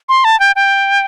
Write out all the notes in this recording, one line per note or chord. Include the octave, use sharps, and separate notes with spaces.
C6
A5
G5
G5